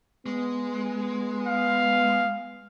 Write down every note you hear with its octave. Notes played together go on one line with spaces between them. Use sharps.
G#3 B3
F5